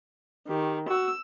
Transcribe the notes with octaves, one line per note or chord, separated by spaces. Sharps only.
D#3 G4
F#4 E6